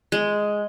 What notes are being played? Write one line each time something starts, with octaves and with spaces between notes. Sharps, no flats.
G#3